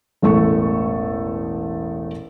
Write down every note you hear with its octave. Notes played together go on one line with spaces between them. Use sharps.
E1 A1 A3 A4 C#6